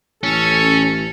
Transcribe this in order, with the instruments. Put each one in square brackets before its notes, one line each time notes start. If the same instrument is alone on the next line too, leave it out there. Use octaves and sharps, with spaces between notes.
[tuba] A1 [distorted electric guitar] C#4 [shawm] A4